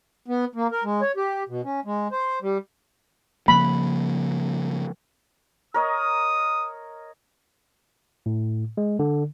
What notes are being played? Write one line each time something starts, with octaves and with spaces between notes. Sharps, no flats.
B3
A#3
A#4
G#3
C#5
G4
B2
C#4
G#3
C5
G3
C#3 F3 A#3 B5
A#4 C#5 D#5 D#6
A2
G#3
D3